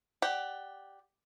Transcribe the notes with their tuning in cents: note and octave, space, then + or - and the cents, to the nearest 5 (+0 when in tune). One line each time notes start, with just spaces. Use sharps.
G4 +0 D5 +0 F#5 +15